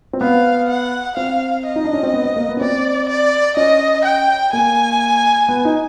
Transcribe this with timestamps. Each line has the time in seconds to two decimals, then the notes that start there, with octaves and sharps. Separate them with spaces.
0.13 C4
0.21 B3 F5
0.68 F#5
1.17 C4 F5
1.65 D#5
1.76 D#4
1.85 D4
1.93 C#4
2.03 C4
2.13 B3
2.25 B3
2.36 A#3
2.49 B3
2.57 C#4
2.60 C4 D5
3.09 D5
3.57 C#4 D#5
4.05 G5
4.53 A#3 G#5
5.49 B3
5.65 D#4